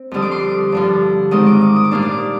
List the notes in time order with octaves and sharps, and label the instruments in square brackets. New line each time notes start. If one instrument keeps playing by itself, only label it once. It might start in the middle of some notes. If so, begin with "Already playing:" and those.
Already playing: [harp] C4
F2 D3 G3 D4 D#6
D6
C6
D6
G2 D3 F3
G#2 D#3 G#3 C4 D#6
D6
D6
D#6
D6
A#2 G3 A#3 D4 C6
D6